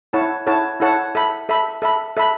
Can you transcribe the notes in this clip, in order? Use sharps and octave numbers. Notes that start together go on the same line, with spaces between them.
E4 A4 C#5 F#5 A5
E4 A4 C#5 F#5 A5
E4 A4 C#5 F#5 A5
A4 E5 B5
A4 E5 B5
A4 E5 B5
A4 E5 B5